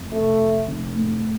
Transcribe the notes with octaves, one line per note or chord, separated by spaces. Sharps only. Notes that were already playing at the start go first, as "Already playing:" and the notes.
Already playing: F1
C3 A3
F2
F1
A2